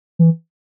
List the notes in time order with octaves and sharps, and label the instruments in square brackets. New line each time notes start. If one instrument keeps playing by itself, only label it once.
[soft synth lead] E3